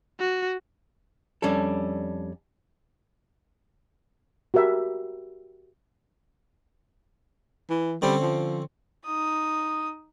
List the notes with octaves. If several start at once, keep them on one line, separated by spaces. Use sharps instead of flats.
F#4
F2 G3 C#4 D4 A4
F#4 G4 A#4 E5
E3
D3 G3 C4 C#4
F3
D#4 D#6